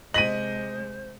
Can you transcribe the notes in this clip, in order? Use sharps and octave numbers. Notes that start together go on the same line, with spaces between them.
C3 G#3 C5 D#5 A#6 B6 D#7 F#7